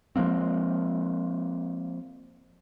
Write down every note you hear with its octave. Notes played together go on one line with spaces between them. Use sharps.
F3 G#3 A#3 C4